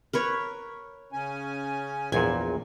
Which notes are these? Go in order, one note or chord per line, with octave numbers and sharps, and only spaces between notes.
A#4 B4 C#5
C#3 C#4 G#5
A#1 E2 A#2 G#5